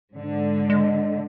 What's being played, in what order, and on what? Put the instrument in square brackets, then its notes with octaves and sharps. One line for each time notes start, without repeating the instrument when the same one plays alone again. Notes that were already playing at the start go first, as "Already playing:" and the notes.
[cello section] G#2 D3
[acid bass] G#3